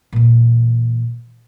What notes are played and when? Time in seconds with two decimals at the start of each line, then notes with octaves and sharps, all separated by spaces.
0.13 A#2 E3